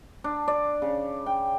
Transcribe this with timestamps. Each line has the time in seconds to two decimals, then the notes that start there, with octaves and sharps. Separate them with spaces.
0.24 D4
0.48 D5
0.82 C#3
1.26 G5